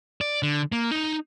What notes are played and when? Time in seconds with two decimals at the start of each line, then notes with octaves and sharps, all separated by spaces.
0.21 D5
0.42 D3
0.72 A#3
0.91 D#4